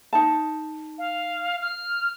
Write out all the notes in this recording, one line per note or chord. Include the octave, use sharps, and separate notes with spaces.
D#4 A5
F5
F6